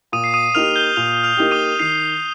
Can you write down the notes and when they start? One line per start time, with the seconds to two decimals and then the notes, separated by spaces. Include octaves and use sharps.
0.12 A#2 D#6 D#7
0.24 C7
0.34 D#6 D#7
0.54 A#3 D#4 G4 F6 F7
0.76 G6 G7
0.96 A#2 F6 F7
1.24 F6 F7
1.37 A#3 D#4 G4
1.51 D#6 D#7
1.79 D#3 C7